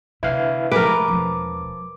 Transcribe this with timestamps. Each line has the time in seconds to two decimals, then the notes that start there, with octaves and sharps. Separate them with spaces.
0.23 D2 C3 E4 B4 F5
0.72 F3 A3 A#4 B4 G#5 D6
1.08 E1 F3